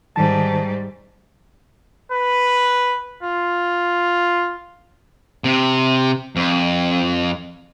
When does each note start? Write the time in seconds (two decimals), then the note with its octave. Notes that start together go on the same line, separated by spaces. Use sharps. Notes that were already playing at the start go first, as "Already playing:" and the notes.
0.16 G#2 D#3 G3 A5
2.12 B4
3.23 F4
5.44 C3
6.36 F2